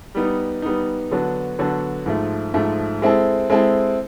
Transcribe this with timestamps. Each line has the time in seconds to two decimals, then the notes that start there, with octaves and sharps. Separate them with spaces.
0.15 G3 B3 D#4
0.62 G3 B3 D#4
1.11 D3 F#3 B3 D4 F#4
1.59 D3 F#3 B3 D4 F#4
2.06 G#2 F3 A3
2.54 G#2 F3 A3
3.02 G#3 C4 E4 A4
3.50 G#3 C4 E4 A4